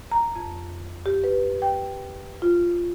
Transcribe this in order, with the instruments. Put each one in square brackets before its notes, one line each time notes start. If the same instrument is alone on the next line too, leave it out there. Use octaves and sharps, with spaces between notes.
[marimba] A#5
F2
G4
B4
G5
F4